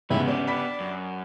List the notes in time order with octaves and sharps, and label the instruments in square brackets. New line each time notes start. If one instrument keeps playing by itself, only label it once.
[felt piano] E2 G#2 C#3 [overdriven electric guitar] B3 G4 [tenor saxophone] E4
[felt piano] C#4 [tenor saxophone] D4
[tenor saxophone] D4 [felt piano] B5 B6
[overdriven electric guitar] F#2